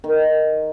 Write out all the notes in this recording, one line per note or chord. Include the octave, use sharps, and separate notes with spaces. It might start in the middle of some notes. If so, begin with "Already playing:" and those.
D#3